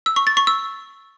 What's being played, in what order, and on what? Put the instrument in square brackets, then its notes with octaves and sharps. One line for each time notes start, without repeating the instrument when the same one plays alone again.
[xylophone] E6
C#6
A6
C#6
E6